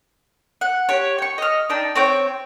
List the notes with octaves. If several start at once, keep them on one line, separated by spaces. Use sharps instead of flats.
F#5
G4 C#5
G5 C#6
D#5 F6
D4 D#4 G5 A5
C4 C#5 G5